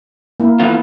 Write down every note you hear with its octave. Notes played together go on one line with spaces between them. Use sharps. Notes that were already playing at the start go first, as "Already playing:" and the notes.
A#3 E4
E3 B3 E4 F4